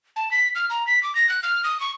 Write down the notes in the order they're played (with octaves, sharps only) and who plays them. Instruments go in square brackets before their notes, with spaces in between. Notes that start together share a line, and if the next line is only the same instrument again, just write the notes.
[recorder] A5
B6
F6
A#5
B6
D6
A#6
F#6
F6
D#6
C#6